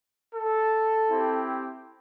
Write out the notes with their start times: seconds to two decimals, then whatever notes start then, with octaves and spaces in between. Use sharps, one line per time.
0.33 A4
1.10 C4 E4 G4